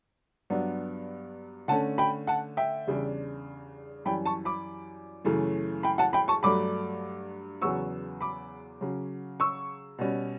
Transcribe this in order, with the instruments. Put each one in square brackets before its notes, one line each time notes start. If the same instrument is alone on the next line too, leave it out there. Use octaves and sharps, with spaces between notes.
[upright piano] G2 F#3 B3 D4
D3 A3 C#4 F#5 A5
G5 B5
F#5 A5
E5 G5
E2 C#3 G3 D4
F#2 E3 G3 G5 B5
A5 C#6
B5 D6
F#2 C#3 E3 A3
G5 B5
F#5 A5
G5 B5
A5 C#6
G2 F#3 A3 D4 B5 D6
E2 C#3 F#3 B3 C#6 E6
B5 D6
C#3 F#3 C#4
C#6 E6
B2 G3 C#4